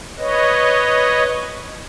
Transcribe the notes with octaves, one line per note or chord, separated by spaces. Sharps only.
B4 C#5 D#5